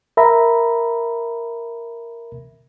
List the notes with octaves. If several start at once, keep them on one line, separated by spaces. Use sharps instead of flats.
A#4 E5 A#5 B5